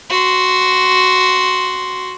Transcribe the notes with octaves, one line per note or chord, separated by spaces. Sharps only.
F#4 C6